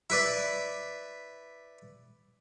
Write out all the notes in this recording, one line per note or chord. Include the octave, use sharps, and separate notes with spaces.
E4 B4 D5